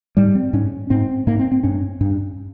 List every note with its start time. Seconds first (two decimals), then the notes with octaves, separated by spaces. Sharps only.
0.17 G#2 G3
0.35 C4
0.53 G#2 C#4
0.90 G#2 C4
1.27 G#2 A#3
1.39 C4
1.52 C4
1.63 G2 C#4
2.01 G2